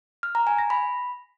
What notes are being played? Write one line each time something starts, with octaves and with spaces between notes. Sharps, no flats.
F6
A#5
G#5
A#6
B5